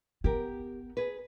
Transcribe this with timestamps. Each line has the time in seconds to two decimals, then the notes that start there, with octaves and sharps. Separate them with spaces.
0.24 B3 G4 A#4
0.97 G#4 B4